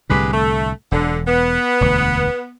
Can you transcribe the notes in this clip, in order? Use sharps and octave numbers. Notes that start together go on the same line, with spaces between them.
C2 A2 D3 G#3 G4 B4
A3
E1 D3
B3
E1 D2